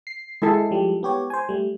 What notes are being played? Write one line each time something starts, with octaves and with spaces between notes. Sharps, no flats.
C7
G#3 E4 A4
F3 G3
B3 G4 C#5
C5 G#5
G3 A3